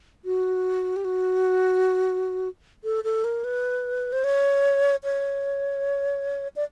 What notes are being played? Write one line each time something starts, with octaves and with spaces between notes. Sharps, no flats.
F#4
G4
F#4
A4
A4
A#4
B4
C5
C#5
C#5
D5